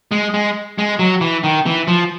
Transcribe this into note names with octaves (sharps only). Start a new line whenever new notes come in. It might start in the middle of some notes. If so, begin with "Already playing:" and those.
G#3
G#3
G#3
F#3
E3
D#3
E3
F3